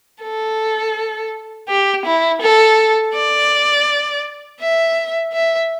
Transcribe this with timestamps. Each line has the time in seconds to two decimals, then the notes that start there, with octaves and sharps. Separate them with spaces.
0.23 A4
1.69 G4
2.06 E4
2.42 A4
3.15 D5
4.61 E5
5.33 E5